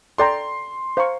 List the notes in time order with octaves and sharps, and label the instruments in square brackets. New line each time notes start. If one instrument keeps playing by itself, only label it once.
[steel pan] A4 D5 G5 A#5 [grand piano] C6
[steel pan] C5 F5 A#5 C#6